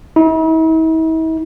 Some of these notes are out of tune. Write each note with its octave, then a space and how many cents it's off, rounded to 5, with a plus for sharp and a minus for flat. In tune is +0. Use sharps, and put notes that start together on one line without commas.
E4 -45